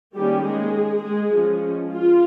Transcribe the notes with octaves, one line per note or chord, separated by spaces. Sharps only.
D#3 G3 A#3 C#4 G4
G#3 G#4
G#3 G#4
F3 G#3 C#4
F4